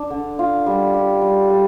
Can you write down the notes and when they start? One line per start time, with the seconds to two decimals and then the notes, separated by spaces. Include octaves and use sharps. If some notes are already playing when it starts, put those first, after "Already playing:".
Already playing: D4
0.10 D3
0.39 F4
0.66 G3
0.94 G4
1.22 G3
1.49 G3